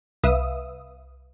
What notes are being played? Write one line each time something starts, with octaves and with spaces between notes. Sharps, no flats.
C2 B4 E5 F5 D#6 E6